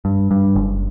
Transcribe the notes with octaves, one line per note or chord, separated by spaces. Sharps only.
G2
G2
F#1